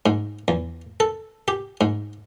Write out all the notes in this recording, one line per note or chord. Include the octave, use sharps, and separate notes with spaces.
G#2
E2
A4
G4
G#2